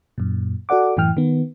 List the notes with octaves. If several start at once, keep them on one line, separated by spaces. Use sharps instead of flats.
F#2 A#2
F#4 A4 D5 F#5 D6
F#2 A2 E3 G5 F6
D#3 B3